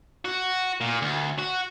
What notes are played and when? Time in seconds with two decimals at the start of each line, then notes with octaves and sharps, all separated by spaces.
0.25 F#4
0.81 A#2
1.02 D2
1.39 F#4